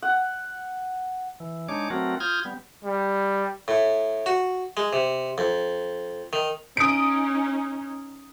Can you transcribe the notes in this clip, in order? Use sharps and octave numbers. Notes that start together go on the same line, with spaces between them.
F#5
E3
G#3 D4 D#4 C#5 D6
F#3 A3 C4 F#4 A#4
F4 D#6 F6 G6 G#6
G3 B3
G3
A2
F#4
G#3
C3
F2
D#3
C#4 D#4 D#6 D7